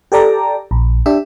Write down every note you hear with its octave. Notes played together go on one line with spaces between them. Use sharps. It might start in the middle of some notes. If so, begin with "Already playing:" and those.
G4 A4 D5 A#5
A#1
D4 G4 E5